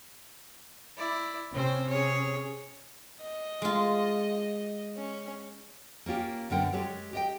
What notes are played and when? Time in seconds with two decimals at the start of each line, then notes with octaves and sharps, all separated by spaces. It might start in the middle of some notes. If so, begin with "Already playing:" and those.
0.97 E4 D5
1.54 C3 C4 C#4 C5
1.89 G#4 C#5
3.21 D#5
3.62 G#3 F4
4.97 C#4
6.06 A#3 C#4 F4 G4
6.50 F#2 D3 B3 A#4 F#5 G5
6.73 G#3 G4 A4 C#5
7.13 G4 D#5 G5